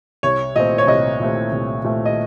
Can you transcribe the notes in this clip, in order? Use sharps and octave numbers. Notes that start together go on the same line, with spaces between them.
C2 C#5
A#2 A3 C4 D#5
C#5
C2 D#5
A#2 A3 C4
C2
A#2 A3 C4
D#5